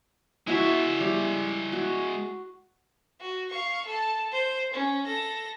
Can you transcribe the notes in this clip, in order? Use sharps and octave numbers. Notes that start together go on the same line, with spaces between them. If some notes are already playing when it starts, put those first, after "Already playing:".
G#3 E4 F#4 E5
G3
F#4
F#4
F5 C#6
A4 A5
C5
C#4
A4 A#6